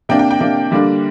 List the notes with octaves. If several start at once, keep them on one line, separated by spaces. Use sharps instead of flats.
C3 A#3 D4 G5
G5
G5
C3 A#3 D4
D3 G3 A#3 D4